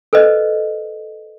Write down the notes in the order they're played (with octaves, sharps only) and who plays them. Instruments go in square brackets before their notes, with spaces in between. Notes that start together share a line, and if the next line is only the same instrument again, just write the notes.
[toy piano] A4 B4 C5 D#5